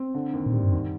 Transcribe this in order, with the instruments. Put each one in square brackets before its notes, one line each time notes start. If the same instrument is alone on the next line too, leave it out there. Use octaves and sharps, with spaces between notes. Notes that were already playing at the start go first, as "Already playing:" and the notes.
Already playing: [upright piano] C4
D3
D#2
[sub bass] A#2
[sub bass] A2 [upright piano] G3
[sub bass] G2
[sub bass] F2 [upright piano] D#3